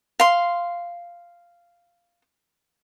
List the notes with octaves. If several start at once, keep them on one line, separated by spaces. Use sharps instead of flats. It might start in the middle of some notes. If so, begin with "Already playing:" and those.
F5 C6